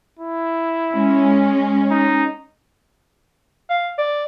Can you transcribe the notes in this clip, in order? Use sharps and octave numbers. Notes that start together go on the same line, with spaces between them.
E4
G#3 C#4
D#4
F5
D5